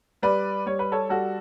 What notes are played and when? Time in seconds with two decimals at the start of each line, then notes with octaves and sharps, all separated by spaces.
0.22 G3 B4 D5
0.66 G3 C#5
0.79 B4
0.92 A4 C#5
1.09 G3 F#4 A4